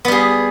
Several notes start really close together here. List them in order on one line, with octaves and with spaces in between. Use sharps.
B3 G3 G#4